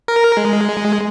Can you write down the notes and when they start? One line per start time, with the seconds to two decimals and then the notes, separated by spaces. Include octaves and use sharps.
0.08 A#4
0.37 G#3